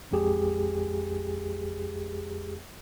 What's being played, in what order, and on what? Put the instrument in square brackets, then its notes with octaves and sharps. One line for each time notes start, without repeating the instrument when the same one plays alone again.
[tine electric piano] A1 F2 G#3 G4 G#4